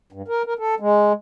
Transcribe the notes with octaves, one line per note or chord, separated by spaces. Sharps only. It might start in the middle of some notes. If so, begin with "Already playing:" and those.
G2
A#4
A#4
A4
G#3